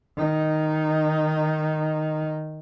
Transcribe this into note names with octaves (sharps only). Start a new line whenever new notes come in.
D#3 D#4